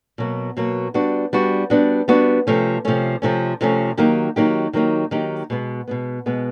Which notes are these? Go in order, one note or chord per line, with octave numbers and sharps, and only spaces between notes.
B2 F#3 A#3
B2 F#3 A#3
G3 B3 D4 F#4
G3 B3 D4 F#4
G3 B3 D4 F#4
G3 B3 D4 F#4
C3 F3 A3 C#4
C3 F3 A3 C#4
C3 F3 A3 C#4
C3 F3 A3 C#4
D#3 F#3 A#3 D#4 G4
D#3 F#3 A#3 D#4 G4
D#3 F#3 A#3 D#4 G4
D#3 F#3 A#3 D#4 G4
B2 G#3 B3
B2 G#3 B3
B2 G#3 B3